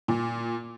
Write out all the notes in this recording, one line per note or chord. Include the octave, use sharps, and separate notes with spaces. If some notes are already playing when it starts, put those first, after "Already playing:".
A#2